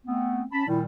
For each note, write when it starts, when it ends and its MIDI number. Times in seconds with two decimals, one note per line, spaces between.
0.06 0.44 57
0.06 0.44 59
0.06 0.44 60
0.52 0.67 61
0.52 0.67 81
0.52 0.67 83
0.68 0.84 46
0.68 0.84 51
0.68 0.84 55
0.68 0.79 64